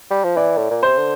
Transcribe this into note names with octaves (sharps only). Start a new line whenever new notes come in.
G3
F3
E3 D5
A2
A#2
C3 C5
D3